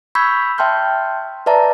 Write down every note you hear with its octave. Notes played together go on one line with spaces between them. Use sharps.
B5 C#6 E6 G6 G#6 B6
E5 G5 A5 C6 F6 G6
B4 D5 E5 A5 A#5